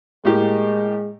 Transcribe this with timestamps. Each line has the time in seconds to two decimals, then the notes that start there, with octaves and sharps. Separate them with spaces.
0.25 A2 G#3 A#3 G4